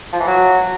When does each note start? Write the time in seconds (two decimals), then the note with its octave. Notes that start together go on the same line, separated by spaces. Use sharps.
0.13 F3
0.20 E3
0.27 F#3